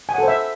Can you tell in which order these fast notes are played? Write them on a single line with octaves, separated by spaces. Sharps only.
G#5 F#5 A4 C5 E5